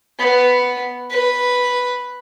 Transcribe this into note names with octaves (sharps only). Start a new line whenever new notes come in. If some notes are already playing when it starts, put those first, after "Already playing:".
B3
B4